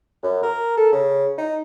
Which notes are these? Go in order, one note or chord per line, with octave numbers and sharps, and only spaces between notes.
F#2
A#4
A4
C#3
D#4